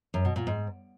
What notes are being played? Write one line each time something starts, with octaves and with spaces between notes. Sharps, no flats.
F#2
B2
A#2
G#2